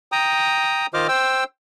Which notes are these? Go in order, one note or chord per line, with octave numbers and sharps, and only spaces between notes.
G5 A#5 D#6
D#3 F4 C5 D#5 D6 F6
C5 G5 E6